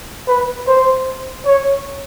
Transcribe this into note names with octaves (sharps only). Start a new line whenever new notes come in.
B4
C5
C#5